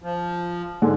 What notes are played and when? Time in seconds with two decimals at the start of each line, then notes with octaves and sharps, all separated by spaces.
0.02 F3
0.82 G#2 D3 G#4